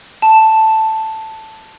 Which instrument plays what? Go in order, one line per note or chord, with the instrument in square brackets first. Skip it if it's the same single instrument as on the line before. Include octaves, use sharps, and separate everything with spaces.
[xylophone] A5